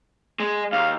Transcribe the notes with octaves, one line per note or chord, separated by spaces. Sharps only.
G#3
D#2 F5